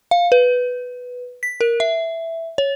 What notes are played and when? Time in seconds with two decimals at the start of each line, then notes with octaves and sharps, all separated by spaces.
0.11 F5
0.32 B4
1.43 B6
1.61 A#4
1.80 E5
2.58 C#5